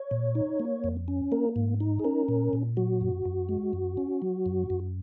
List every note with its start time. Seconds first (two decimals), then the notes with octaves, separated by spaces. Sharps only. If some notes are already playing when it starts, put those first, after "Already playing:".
Already playing: C#5
0.11 A#2
0.35 D#4
0.60 A#3
0.84 F2
1.08 C#4
1.32 A#3 A#4
1.56 G#2
1.80 D#4
2.00 G#4
2.04 C#4 A#4
2.28 A#2
2.53 A#2
2.77 F#3 F#4
3.01 F#2
3.26 F#2
3.49 G#3
3.73 F#2
3.97 C#4
4.22 F#3
4.46 F#2
4.70 F#2